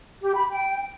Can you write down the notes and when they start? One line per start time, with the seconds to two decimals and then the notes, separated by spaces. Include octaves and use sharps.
0.22 G4
0.36 B5
0.50 G5